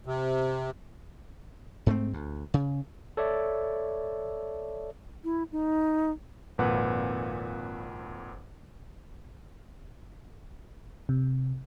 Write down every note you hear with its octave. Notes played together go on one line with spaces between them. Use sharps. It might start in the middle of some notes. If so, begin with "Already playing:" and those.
C3
G#2 A3 C4
D2
C#3
A4 C#5 D5 E5
E4
D#4
G#1 F2 A#2 B4 F#5 F#6
C3